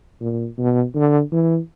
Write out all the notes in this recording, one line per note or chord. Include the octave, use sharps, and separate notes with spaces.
A#2
B2
D3
E3